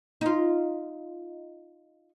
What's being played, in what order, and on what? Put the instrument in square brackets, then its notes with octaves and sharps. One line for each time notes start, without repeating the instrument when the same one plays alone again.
[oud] D#4 F4